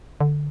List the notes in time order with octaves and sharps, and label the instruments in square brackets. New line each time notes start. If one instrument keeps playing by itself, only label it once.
[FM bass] D3